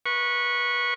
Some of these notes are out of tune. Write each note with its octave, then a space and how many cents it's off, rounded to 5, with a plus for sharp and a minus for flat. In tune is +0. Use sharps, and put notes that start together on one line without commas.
B4 -25 C#6 -10